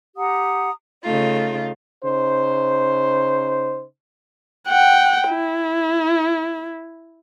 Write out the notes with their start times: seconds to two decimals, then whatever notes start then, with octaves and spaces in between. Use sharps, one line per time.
0.17 G4 F#5 A#5 D#6
1.03 C#3 A3 D#4 F4
2.03 C#3 D#4 C5
4.68 F#5 G5
5.29 E4